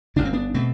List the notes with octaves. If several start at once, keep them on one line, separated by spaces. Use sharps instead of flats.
G1 F#2 D3 D4
C4
B3 D4
B2 A3 C4